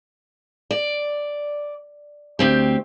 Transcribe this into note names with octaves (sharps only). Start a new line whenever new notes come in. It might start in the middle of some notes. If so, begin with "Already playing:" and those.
D5
D2 C4 G4